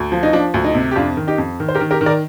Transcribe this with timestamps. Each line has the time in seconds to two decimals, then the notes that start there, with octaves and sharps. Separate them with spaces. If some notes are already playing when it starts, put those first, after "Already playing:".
Already playing: D2
0.12 F3
0.23 D#4
0.33 F3 D4
0.54 D2
0.64 D#4
0.75 C3
0.91 G4
0.96 F2 D4 F4
1.17 D#3
1.27 D#4 G4
1.38 F2
1.60 D#3
1.69 C5
1.75 G4 A#4
1.81 D#3
1.91 G4 A#4
2.01 D#3
2.06 A#4 D5